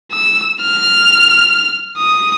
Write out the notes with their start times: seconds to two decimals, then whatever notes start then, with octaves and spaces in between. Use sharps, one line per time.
0.12 E6
0.62 F6
1.98 D#6